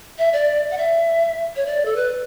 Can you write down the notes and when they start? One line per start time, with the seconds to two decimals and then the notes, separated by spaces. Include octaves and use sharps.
0.19 E5
0.33 D5
0.71 F#5
0.78 E5
1.56 C#5
1.66 D5
1.85 A4
1.96 B4